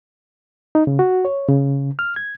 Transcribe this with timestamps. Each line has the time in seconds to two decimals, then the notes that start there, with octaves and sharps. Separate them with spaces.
0.75 D#4
0.87 C#3
0.99 F#4
1.25 C#5
1.49 C#3
1.99 F6
2.16 G#6